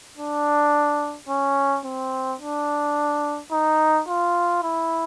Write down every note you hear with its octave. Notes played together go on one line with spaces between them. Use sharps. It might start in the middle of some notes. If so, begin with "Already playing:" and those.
D4
C#4
C4
D4
D#4
F4
E4